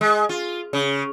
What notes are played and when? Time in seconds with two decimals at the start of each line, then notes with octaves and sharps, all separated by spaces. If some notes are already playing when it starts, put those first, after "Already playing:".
0.01 G#3
0.29 F4
0.73 C#3